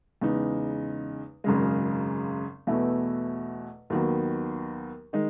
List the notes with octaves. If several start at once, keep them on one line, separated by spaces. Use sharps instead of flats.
E2 C#3 G#3 D#4
G#1 F#2 C#3 G#3
E2 B2 A3 E4
D#2 D#3 F#3 B3
D#3 G#3 D#4